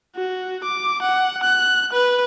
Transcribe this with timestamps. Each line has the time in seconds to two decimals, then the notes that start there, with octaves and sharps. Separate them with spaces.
0.16 F#4
0.64 D6
1.02 F#5
1.43 F#6
1.93 B4